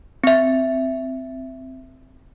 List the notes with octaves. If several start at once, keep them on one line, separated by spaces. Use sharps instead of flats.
C4 E5